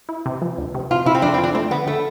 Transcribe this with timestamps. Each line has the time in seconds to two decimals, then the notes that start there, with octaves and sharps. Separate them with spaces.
0.09 E4
0.26 C3
0.42 F3
0.58 D2
0.75 C3
0.91 C3 F4
1.06 C3 E4
1.15 C4
1.22 F2 D4
1.34 C4
1.38 F3
1.44 D4
1.55 A3 C4
1.71 D3 B3
1.87 D3 A3